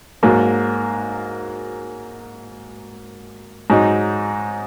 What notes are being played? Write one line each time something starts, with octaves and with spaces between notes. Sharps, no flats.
G#2 F#3 A#3
G#2 F#3 D#4